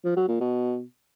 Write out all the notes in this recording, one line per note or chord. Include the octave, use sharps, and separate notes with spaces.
F3
F#3
A#2
B2